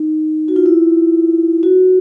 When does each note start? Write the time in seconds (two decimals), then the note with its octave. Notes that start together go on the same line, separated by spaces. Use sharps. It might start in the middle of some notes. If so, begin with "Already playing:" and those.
Already playing: D#4
0.48 F#4
0.56 F4
0.66 E4
1.63 F#4